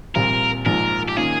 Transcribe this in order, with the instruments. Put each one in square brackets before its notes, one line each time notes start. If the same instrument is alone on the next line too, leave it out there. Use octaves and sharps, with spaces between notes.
[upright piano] A#1 A#2 G3 C4 F4 [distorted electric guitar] A#4
[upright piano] A#1 G#2 F3 [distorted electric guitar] A#4
[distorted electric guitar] G4
[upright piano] D#3 A#3 C#4 F4 [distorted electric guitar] G#4